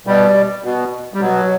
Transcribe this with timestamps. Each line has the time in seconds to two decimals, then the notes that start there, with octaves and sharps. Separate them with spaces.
0.07 B2 G3
0.64 B2
1.14 G3
1.21 B2 F#3